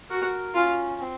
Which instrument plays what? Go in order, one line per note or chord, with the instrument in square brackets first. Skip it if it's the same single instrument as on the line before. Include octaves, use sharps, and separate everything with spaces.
[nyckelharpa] F#4 [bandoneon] A#4
[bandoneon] C#4 [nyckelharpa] F4
[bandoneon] C4